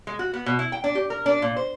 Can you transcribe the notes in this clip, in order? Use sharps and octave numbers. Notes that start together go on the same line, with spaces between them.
G#3
F#4
B3
B2
E4
G5
D4
G4
A#4
D4
A#2
C5